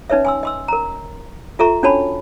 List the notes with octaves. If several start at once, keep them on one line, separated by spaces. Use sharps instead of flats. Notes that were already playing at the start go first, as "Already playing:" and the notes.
C#4 D#4 B4 C#5 E5
G#5 C6 E6
D#5 C6 E6
A#4 A#5
F4 A4 E5 A#5 C#6
C#4 D4 F#4 C#5 A5 B5